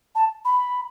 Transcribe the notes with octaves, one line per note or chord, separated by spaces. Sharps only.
A5
B5